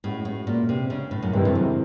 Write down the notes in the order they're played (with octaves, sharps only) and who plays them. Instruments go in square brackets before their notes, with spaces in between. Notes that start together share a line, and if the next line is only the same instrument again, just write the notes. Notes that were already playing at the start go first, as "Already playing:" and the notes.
[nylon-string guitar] A2 [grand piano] G#3 C#4 F#4
[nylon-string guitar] A2
A#2
C3
C#3
A2
F#2
[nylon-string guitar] G2 [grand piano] C3 D#3 G#3 C4 E4
[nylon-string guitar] F2
F#2